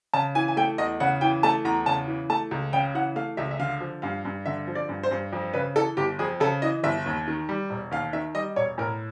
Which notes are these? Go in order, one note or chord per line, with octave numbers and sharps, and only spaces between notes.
C#3 A5
E3 G#5
G#5
A3 G5
E2 D#5
C#3 F#5
E3 G5
A3 A5
E2 A#5
C#3 A5
E3
A3 A5
C#2
C#3 G5
E3 F#5
A3 F5
C#2 E5
E5
D3 F5
F3
G2 F5
G2
D3 E5
F3
D5
G2
C5
G2
F2
C#3 B4
E3 A4
G1 G4
F2 G#4
C#3 A4
E3 D#5
G1 E5
D#2
D#3
G3
E1
D#2 F5
D#3 E5
G3 D#5
E1 C#5
A2 A#4